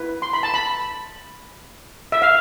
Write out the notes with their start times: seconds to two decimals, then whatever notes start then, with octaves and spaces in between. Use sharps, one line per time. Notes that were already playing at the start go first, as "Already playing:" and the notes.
Already playing: E4 B4
0.22 C6
0.33 B5
0.43 A5
0.54 B5
2.12 E5
2.22 F5